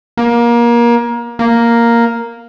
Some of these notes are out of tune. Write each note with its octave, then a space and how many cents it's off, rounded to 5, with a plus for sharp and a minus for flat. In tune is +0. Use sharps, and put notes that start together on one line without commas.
A#3 +25
A#3 +0